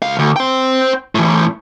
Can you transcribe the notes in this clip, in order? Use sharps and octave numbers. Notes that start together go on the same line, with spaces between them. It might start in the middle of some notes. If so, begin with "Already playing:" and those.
C#2 F5
D2
C5 G5
A2 E3